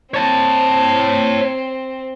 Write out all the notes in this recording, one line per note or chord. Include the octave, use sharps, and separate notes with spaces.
C4 C#5 A5